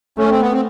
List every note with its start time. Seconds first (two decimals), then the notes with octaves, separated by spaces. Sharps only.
0.17 A3 C#4
0.30 C4
0.41 B3
0.53 C4